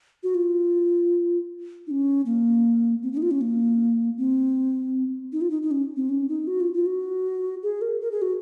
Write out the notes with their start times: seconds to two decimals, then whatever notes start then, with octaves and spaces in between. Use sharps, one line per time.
0.23 F#4
0.35 F4
1.87 D#4
1.91 C#4
2.26 A#3
3.03 C4
3.13 C#4
3.17 D#4
3.22 F4
3.31 C#4
3.41 A#3
4.18 C4
5.33 D#4
5.41 F4
5.50 D#4
5.62 D#4
5.71 C#4
5.96 C4
6.09 C#4
6.29 D#4
6.47 F#4
6.60 F4
6.74 F4
6.86 F#4
7.63 G#4
7.82 A#4
8.01 A#4
8.12 G#4
8.22 F#4